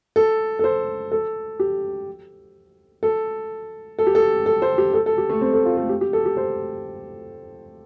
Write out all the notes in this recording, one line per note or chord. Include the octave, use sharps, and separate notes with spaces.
A4
A4
C5
A4
G4
A4
A4
G4
A4
A4
C5
G4
A4
A4
G4
A3
C4
A4
F4
A3
G4
G4
A4
G4
C5